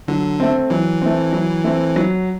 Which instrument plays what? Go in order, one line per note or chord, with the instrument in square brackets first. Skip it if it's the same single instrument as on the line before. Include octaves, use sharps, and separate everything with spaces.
[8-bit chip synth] D3 [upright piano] F#3
[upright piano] A3 C4
[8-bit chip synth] E3 [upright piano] F#3
[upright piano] A3 C4
F#3
A3 C4
F#3